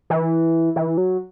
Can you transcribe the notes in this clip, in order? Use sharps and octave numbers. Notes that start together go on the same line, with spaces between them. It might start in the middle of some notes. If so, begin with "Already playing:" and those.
E3
E3
F#3